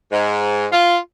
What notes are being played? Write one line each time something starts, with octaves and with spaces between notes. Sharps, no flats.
G#2
F4